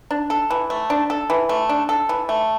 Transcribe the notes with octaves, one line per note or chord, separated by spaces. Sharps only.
D4
A4
E3
A3
D4
A4
E3
A3
D4
A4
E3
A3